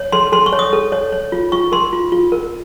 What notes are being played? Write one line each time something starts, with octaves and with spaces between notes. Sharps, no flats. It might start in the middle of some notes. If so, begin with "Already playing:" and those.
Already playing: C#5
A4 C6
A4 C6
C#6
C#5
D#6
A4
C#5
C#5
F4
F4 C#6
A#4 C6
F4
F4
A#4